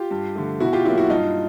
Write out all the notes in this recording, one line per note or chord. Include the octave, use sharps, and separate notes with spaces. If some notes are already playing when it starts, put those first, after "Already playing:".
Already playing: F4 G4
G2
D3 F3 A3
B2 E4 F#4
F4 G4
F#3 A#3 E4 F#4
E4 F#4
G2 D#4 F4